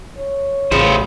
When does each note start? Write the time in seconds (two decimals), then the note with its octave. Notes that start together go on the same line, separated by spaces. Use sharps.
0.18 C#5
0.72 A1 C#3 B3 F4 C5